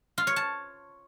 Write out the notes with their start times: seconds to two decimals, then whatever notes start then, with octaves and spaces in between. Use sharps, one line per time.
0.18 F4
0.27 C#5
0.36 A5